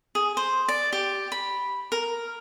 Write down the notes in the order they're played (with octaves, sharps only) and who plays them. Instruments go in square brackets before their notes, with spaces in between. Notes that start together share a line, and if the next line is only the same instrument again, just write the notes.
[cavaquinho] G#4
C5
D5
G4
B5
A#4